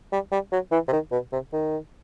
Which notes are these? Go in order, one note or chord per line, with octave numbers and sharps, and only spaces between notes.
G3
G3
F#3
E3
C3
D#3
B2
C3
D#3